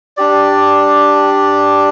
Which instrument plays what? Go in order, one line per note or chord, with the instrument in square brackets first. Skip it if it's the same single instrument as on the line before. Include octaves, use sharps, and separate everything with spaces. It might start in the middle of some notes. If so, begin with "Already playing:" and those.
[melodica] D4 G4 D5